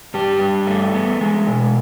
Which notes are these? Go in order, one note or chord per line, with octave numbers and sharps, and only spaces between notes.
G2 G3 G4
G2
A3
B3
G#3
B2